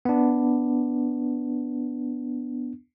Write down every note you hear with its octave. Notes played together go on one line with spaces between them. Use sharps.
B3 D4